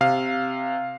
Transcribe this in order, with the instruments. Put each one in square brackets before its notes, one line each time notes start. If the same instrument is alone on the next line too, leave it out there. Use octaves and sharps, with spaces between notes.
[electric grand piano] C3 F5